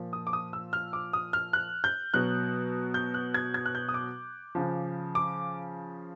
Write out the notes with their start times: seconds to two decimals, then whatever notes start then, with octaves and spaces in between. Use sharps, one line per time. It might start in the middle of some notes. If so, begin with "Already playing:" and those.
Already playing: A#2 F3
0.13 D#6
0.27 D6
0.33 D#6
0.53 E6
0.73 F6
0.93 D6
1.13 D#6
1.33 F6
1.53 F#6
1.84 G6
2.14 B2 F#3 F#6
2.94 G6
3.14 F#6
3.34 G#6
3.54 G#6
3.66 F#6
3.75 G6
3.89 D#6
3.94 D6
4.55 C#3 F3
5.15 D6